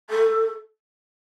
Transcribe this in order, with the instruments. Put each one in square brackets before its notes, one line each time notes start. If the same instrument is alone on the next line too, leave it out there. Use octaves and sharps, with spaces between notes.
[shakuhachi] A4